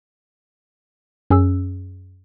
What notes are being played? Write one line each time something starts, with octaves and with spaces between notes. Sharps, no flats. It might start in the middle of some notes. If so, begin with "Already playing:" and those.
F#2 C#4 G#4 E6